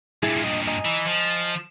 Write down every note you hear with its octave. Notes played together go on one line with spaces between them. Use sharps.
G2 A#2 E4 G#4
D#5
D#5 G#5 A#5
E3
F3